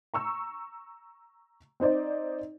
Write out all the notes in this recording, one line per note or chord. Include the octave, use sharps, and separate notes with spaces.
A#5 C#6 E6
C4 D#4 C5 D5